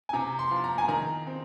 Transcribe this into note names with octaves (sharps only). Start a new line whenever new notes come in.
G#5
C3 A#5
C6
F3
A#5
G#5
D#3 A#5
C4